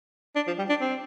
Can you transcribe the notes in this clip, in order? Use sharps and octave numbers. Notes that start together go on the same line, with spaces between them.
D4
F3
G3
D4
C4